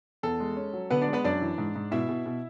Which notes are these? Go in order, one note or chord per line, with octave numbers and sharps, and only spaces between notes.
E2 A4
G#3
C#4
F#3
D3 B3 B4
D4 D5
G#3
B3 B4
F#2 D4 D5
E3
G#2
G#2
B2 E4 E5
B2
B2